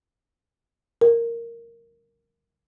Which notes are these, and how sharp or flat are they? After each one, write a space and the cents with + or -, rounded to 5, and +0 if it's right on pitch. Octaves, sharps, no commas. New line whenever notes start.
A#4 -5